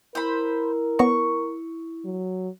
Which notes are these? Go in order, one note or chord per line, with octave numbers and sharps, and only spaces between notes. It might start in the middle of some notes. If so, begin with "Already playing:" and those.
E4 A#4 C5 B5
B3 C#5 A#5 C#6
F#3